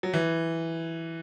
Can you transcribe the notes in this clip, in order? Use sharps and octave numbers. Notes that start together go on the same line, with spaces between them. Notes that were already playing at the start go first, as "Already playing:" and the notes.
F#3
E3